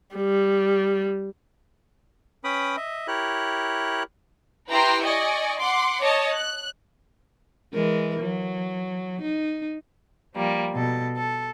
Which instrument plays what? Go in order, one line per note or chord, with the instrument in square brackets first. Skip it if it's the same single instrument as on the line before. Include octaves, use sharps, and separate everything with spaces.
[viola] G3
[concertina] C#4 B4 G5 B5 D#6
D#5 E5
E4 G4 A#4 C#5 F#6
[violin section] E4 G4 B4 G5 A#5 C6
D5 D#5 G#5 C#6
F#5 C6 D6
C#5 D#5 A5
F#6
[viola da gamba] E3 G#3 A#4
F#3
D#4
[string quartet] F3 G3 A#3
B2 A4
A4